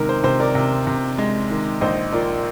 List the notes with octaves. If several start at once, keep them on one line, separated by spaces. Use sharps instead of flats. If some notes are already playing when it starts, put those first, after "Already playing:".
Already playing: C3 D#3 G#3 A#4
C5
C3 C5
A#4 D5
C3
C3
G#3
D#3
A#1 C5 D#5
A#2 A#4 D5